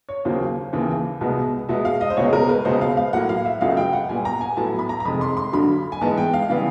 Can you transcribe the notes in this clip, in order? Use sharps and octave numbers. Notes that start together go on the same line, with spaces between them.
C#5
D#2 C#3 F#3 A#3 C5
D#2 C#3 E3
C2 B2 G#3 B3
B2 G#3 B3 E5
F5
D#5
C5
C#2 B2 G#3 B3 C#5
A#4
B4
C#2 B2 G#3 B3 C5
F5
F5
A2 F#3 A#3 F#5
F5
E5
C#2 C#3 F#3 A3 F5
G5
F#5
A#2 G3 B3 G#5
A#5
G#5
A2 F#3 B3 A5
B5
A#5
A#5
F2 C3 D#3 G#3 B5
C6
C6
G2 D3 F#3 B5
G#5
G#2 E3 G#3 B3 A5
G5
F5
C#3 E3 G3 B3